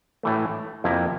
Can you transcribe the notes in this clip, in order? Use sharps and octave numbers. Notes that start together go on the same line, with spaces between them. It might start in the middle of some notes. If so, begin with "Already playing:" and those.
A2 E3 A3
F2 C3 F3 A#3 E4